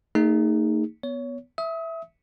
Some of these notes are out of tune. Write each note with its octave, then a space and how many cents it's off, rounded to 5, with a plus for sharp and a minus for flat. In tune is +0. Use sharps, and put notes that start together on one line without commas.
A3 +45 D#4 +0 G#4 -20
B3 +0 C#5 +20
E5 +0 D#6 +35